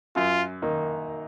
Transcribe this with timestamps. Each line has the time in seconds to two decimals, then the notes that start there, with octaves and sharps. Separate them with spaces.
0.16 F#2 F4
0.62 D#3 A#3 D#4